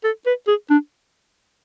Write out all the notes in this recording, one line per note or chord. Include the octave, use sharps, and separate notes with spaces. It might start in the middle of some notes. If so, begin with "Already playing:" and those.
A4
B4
G#4
D4